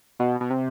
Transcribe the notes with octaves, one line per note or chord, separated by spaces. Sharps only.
B2
B2
C3